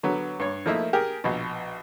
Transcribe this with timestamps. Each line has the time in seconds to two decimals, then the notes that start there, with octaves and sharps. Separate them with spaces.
0.03 D3 F#3 B3
0.39 G2 C#5
0.66 F3 A3 A#3 D#4 E4
0.93 G4 G#4 A#4
1.24 A#1 B2